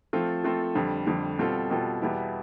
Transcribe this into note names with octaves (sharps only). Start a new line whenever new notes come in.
F3 A3 C4 F4 A4
F3 A3 C4 F4 A4
F2 D3 G3
F2 D3 G3
B2 G3 C4 F4 A4
B2 G3 C4 F4 A4
E2 B2 G3 B3 E4